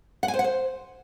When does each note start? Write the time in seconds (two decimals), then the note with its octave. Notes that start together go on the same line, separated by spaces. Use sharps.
0.23 F#5
0.28 G#5
0.34 C5
0.39 F#5
0.44 C5